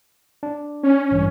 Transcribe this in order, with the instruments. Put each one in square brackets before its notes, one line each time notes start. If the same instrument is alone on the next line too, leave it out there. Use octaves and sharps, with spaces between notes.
[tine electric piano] D4
[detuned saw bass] C#4
[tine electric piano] A1 G2